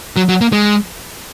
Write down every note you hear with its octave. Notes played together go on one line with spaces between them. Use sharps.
F#3
F#3
A#3
G#3